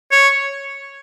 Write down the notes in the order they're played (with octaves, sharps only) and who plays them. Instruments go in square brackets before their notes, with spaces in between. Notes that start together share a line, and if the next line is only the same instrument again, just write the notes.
[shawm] C#5